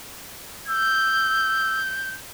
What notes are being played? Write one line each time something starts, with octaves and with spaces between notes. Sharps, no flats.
E6 G6